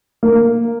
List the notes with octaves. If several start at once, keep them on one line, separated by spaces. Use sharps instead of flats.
A#3